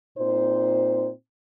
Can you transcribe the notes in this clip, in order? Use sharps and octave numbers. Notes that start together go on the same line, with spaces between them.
A#2 C4 D#4 C5